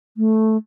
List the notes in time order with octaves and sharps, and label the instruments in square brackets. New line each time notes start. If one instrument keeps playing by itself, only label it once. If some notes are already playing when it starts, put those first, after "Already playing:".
[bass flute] A3